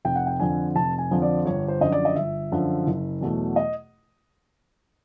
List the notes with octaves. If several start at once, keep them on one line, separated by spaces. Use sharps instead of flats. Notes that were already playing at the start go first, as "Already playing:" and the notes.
F1 G5
F#5
G5
F2 D3 F3 G#5
F1 A5
G#5
F2 D3 F3
D5
G1 C#5
C5
F#2 D3 F3 D#5
D5
D#5
G1 E5
F#2 D3 F3
F#1
E2 B2 F#3 A3
D#5